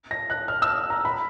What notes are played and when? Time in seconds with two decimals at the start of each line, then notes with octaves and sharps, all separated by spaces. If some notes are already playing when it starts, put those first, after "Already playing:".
0.11 A#6
0.30 F#6
0.48 F6
0.62 E6
0.90 A#5
1.05 B5